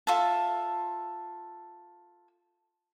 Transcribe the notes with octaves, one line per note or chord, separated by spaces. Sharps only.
F4 A4 E5 A5